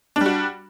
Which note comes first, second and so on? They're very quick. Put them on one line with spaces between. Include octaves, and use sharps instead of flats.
D4 G3 F#4